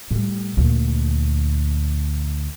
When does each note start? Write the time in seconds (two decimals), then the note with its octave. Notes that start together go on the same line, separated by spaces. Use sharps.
0.11 A2 G3
0.57 D2 A#2